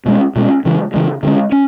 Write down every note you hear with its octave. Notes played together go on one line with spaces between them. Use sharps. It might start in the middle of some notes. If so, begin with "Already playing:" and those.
B2 G#3 C#4
B2 G#3 C#4
C#3 E3 G#3
C#3 E3 G#3
D3 F3 G#3 C#4
C#4